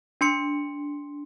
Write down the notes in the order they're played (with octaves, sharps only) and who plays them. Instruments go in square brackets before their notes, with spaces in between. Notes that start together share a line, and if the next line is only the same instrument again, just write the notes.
[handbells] D4 C6 C#7